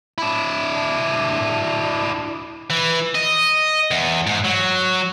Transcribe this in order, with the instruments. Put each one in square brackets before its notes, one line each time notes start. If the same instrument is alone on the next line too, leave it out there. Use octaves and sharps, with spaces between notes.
[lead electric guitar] D4 E4
[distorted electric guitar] E3
D#5
E2
G#2
F#3